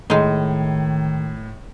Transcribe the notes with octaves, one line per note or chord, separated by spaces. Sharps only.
A2 D#3 G#3 D#4